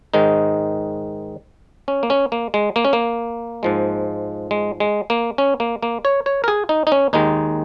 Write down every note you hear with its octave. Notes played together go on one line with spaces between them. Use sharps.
G#2 D#3 G#3 D#4
C#4
A#3
C#4
A#3
G#3
A#3
C#4
A#3
G#2 F3 G#3
G#3
G#3
A#3
C#4
A#3
A#3
C#5
C#5
A#4
G#4
D#4
D#4
C#4
D#2 D#3 G#3 D#4